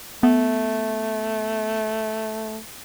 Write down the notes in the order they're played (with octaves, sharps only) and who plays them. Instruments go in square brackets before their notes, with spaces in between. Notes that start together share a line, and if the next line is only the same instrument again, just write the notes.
[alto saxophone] A3 [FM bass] B3